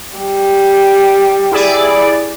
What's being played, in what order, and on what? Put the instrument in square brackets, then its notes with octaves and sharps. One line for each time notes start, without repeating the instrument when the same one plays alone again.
[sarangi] G3
[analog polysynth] E4 G#4 D5